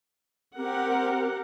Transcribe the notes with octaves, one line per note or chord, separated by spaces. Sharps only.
C4 G4 A#4 F#5